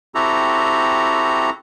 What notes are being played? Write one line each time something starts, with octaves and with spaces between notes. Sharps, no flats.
C4 E4 F#4 G4 A4 A#5